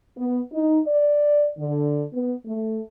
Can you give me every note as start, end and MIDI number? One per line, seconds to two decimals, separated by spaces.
0.17 0.41 59
0.52 0.80 63
0.87 1.49 74
1.59 2.02 50
2.13 2.34 59
2.46 2.80 57